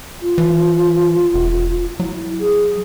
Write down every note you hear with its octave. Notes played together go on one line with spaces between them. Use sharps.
F4
E3
E1
F#3 E4
G#4